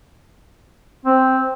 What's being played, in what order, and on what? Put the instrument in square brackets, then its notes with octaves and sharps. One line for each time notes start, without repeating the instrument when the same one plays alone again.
[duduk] C4